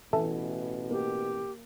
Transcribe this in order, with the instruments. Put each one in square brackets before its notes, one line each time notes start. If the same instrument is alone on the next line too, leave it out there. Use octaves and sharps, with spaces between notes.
[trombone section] A1 B2 [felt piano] E3 [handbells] A4 E5 A5
[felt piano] A#3 [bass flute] G4